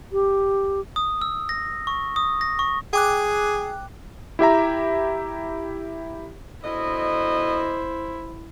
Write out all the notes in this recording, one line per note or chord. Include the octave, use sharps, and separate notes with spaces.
G4
D#6
E6
A#6
C#6
D#6
A#6
C#6
G#4 G5 D6 F#6
E4 G4 E5 A#5
B2 D3 E4 C5 D#5